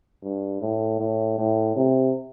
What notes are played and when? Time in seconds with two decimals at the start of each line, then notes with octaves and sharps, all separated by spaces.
0.23 G2
0.61 A2
0.99 A2
1.38 A2
1.76 C3